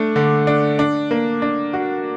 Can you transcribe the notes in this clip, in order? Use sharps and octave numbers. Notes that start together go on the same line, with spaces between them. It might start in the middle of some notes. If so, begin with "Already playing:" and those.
Already playing: A3 D4
D3
D4
D4
A#3
D4
F#4